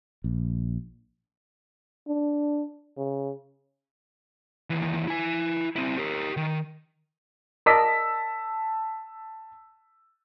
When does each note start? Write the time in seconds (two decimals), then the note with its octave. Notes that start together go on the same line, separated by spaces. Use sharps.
0.24 A#1
2.08 D4
2.97 C#3
4.70 D#2 E3
5.08 E4 G#5
5.76 C4 E4
5.98 G4 A#4
6.37 D#3
7.66 A#4 D5 D#5 A5 E6 B6